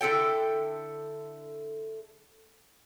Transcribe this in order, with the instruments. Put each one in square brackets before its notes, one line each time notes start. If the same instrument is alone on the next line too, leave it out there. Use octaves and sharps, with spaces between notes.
[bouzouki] D3 E4 A4 G5